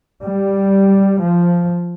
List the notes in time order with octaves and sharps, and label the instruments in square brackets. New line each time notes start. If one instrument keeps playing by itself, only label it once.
[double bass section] G3
F3